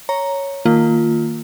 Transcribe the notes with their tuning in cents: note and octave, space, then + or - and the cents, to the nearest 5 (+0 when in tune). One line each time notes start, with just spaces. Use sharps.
C#5 +0 A#5 +0
D#3 +5 A#3 -20 F4 +0